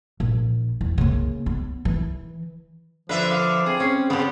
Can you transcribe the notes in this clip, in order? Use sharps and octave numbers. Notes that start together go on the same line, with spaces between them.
A#1
E2
C#3 A#3
B3
E3
D3 F3 D4 B4 E5
F5
C4 G#4
C#4
C#3 B3 G4